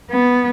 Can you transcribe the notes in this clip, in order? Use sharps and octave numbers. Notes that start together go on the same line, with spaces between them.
B3